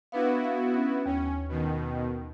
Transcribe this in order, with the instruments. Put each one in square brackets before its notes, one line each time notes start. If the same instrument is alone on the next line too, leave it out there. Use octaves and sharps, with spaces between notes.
[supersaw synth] B3 E4 F#4 [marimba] D4 B4 F5
[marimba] F5
C#4
[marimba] D#2 [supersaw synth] C#4
[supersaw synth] B2 D#3